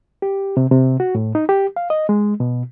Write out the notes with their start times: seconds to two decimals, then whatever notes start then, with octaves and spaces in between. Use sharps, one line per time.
0.22 G4
0.57 C3
0.71 C3
1.00 F#4
1.15 A2
1.35 D#4
1.49 G4
1.76 F5
1.90 D#5
2.09 G#3
2.40 B2